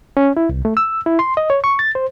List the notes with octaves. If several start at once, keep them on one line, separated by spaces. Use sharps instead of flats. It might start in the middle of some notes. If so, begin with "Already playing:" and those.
C#4
E4
C2
A3
E6
E4
C6
D#5
C#5
C#6
A6
C5